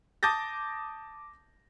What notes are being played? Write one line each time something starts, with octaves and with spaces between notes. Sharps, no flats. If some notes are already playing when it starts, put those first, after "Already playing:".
A5 D6 D#6 G6 A6 A#6